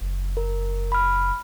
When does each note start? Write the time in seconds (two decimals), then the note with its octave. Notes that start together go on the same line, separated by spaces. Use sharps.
0.01 F#1
0.37 A#4
0.92 B5 F6